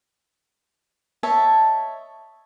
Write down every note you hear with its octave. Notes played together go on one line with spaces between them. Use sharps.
C#5 D#5 E5 A5